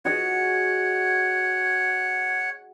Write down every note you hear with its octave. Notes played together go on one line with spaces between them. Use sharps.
F#4 G#4 C#5 D#5 F#5